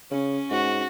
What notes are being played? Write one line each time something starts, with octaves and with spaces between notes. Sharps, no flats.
C#3 C#4
G#2 F#4